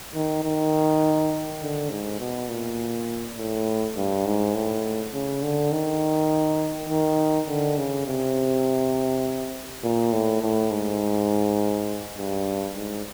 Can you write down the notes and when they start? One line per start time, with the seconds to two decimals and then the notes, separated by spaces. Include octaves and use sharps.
0.15 D#3
0.44 D#3
1.62 D3
1.90 G#2
2.19 B2
2.49 A#2
3.37 A2
3.96 G2
4.26 G#2
4.54 A2
5.13 C#3
5.43 D3
5.71 D#3
6.89 D#3
7.48 D3
7.77 C#3
8.07 C3
9.84 A#2
10.12 A2
10.42 A2
10.71 G#2
12.18 G2
12.76 G#2